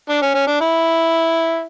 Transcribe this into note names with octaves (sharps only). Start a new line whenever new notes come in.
D4
C#4
C#4
D4
E4